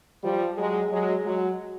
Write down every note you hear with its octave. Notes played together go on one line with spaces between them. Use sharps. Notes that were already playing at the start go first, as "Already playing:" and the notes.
F3 G3
F#3 G#3
F#3 G#3
F#3 G#3